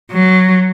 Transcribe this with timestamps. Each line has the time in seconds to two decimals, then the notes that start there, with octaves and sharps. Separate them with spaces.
0.12 F#3